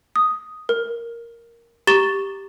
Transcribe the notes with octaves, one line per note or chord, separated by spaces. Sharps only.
D#6
A#4
G4 A#5 C#6 A6 E7 G7